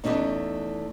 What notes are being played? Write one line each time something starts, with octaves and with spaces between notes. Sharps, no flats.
E2 A#2 A3 C#4 D#4